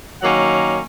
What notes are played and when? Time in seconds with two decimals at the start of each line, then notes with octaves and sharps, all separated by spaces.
0.22 D#3 F#3 A#3 C#4 F#5